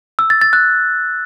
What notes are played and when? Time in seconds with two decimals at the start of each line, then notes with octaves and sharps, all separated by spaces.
0.19 E6
0.30 A6
0.42 A6
0.53 F#6